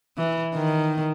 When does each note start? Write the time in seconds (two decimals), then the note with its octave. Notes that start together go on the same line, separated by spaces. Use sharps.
0.17 E3
0.55 D#3